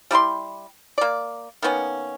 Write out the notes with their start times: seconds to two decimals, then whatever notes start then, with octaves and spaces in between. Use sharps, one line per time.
0.11 G3 E4 G4 C6
0.98 A#3 D5
1.62 D#3 A#3 B3 C#4